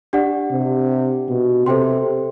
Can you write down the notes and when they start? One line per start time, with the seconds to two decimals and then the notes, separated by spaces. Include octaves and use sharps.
0.13 D4 G4 D5 F#5
0.51 C3
1.28 B2
1.66 C3 A4 C5 G5 C6